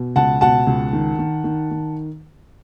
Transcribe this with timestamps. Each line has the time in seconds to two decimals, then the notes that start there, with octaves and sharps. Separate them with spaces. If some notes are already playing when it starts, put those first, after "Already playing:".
Already playing: B2
0.16 C#2 F#5 A5
0.41 B2 F#5 A5
0.67 C#2
0.93 D#3
1.19 D#3
1.44 D#3
1.71 D#3